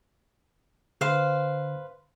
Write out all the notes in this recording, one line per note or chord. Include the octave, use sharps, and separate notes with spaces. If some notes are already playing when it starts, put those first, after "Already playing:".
D3 B4 C5 F5